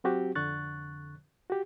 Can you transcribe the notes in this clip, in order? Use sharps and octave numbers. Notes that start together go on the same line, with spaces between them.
F#3 C4 F#4 G4
F2 D3 C#6 F#6 A6
F#4 G4